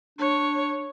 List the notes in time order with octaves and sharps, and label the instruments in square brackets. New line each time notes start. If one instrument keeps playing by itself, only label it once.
[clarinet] D4 [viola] C#5